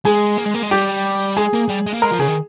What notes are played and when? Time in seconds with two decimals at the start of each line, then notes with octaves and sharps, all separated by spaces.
0.05 G#3 G#4
0.38 A#3
0.46 G#3
0.55 A#3
0.63 G#3
0.71 G3 G4
1.37 G#3 G#4
1.54 A#3
1.69 G3
1.87 G#3
1.94 A#3
2.02 G#3 A#4
2.11 F3
2.19 C#3 G#4
2.28 D#3